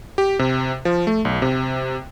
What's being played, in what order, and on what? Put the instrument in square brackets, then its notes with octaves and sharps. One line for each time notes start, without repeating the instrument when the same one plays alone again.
[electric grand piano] G4
C3
F3
A3
B1
C3